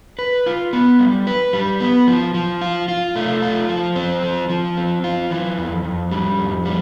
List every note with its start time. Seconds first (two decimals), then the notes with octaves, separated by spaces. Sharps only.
0.19 B4
0.46 F4
0.73 B3
1.00 G3
1.27 B4
1.53 G3
1.81 B3
2.08 F3
2.34 F3
2.61 F4
2.88 F4
3.16 A3
3.42 F4
3.69 F3
3.96 C4
4.23 F3
4.50 F3
4.77 C4
5.04 F4
5.31 E3
5.58 F2
5.85 F2
6.12 G3
6.39 F2
6.65 G3